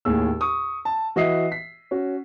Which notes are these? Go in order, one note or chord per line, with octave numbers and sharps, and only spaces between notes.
D#2 A2 G#4 E6
C#6 D#6
A5
E3 F#4 D#5 E5 D#6 C7
B6
C#4 F#4